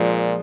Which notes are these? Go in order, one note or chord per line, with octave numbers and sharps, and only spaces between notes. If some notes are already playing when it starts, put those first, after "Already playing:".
Already playing: A#2 F3 G#3 D4